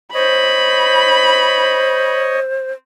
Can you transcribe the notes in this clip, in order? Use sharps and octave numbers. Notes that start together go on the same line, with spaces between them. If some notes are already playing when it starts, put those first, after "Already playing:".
C5 C#5 D#5 B5